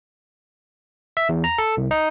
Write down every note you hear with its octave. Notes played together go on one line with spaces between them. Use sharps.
E5
E2
A#5
A4
C2
D#4